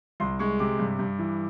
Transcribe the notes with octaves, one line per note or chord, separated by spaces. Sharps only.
C2 C6
G#3 C#6
C3 D6
G2
G2
E3